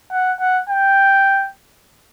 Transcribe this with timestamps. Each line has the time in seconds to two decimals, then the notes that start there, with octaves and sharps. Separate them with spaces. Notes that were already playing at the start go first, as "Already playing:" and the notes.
0.12 F#5
0.40 F#5
0.70 G5